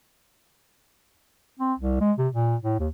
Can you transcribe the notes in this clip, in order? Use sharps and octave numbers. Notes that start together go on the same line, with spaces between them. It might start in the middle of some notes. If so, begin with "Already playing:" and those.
C4
C2
G#3
C3
A#2
A2
D#2